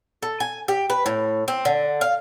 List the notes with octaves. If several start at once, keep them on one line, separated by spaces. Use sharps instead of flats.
A4
G#5
G4
B4
A2
C4
D3
F5